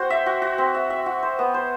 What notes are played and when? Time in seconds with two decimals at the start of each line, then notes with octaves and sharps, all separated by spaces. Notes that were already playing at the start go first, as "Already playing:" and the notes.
Already playing: C4 F#4 C5
0.10 E5
0.26 F#4
0.42 F#4
0.58 C4
0.75 E5
0.90 E5
1.06 F#4
1.23 C5
1.39 B3
1.54 C5